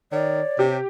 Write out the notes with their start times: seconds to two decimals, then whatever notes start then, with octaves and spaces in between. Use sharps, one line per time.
0.12 D#3 C#5 D5
0.59 C3 G4